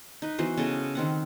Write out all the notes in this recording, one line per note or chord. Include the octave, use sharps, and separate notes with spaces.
D#4 B4
E3 B3 F#4 C5
C#3 B3 A4 D#5
D#3 C4 F#5